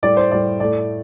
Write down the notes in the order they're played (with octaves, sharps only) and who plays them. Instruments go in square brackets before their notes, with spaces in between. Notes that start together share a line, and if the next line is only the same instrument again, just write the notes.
[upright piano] A2 G3 D5
C5
A2 G3 D5
A2 A3 D5